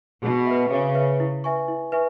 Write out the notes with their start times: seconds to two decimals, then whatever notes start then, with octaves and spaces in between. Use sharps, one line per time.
0.22 B2 G#4
0.46 B4 E5
0.70 C#3 G#4
0.95 B4 E5
1.20 E4
1.44 B4 E5 G#5 C#6
1.68 E4
1.92 B4 E5 G#5 C#6